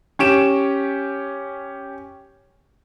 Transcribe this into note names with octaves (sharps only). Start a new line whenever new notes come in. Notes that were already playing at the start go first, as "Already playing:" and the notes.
C#4 G4 D7 E7